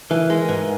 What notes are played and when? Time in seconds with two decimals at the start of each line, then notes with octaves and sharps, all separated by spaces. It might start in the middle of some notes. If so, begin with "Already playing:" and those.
0.10 E3 A#4
0.30 G#3 A#4
0.49 G#2 B4